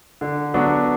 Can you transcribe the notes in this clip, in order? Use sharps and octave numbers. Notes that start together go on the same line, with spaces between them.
D3
F#3 B3 D4 F#4